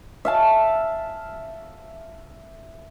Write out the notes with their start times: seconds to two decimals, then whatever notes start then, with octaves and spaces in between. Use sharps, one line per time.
0.25 E5 F5 A5